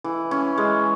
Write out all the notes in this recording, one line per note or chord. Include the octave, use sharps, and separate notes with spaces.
E3
C#4
G#3